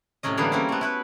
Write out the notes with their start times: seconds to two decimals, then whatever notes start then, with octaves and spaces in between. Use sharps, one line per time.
0.23 A2 C3 F#3 C#4 D#5
0.37 D3 E3 G3 A#3 B3 G#4
0.52 G3 A#3 C4 C#4 E4
0.69 A3 B3
0.81 E4 F#4 B4